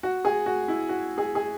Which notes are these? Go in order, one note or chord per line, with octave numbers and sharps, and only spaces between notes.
F#4
G#4
F#4
E4
F#4
G#4
G#4